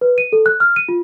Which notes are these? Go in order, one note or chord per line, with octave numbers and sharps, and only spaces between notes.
B4
D#7
A4
F#6
F6
D#7
F4